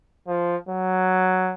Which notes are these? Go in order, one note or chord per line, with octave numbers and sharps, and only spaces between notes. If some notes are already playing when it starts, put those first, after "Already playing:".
F3
F#3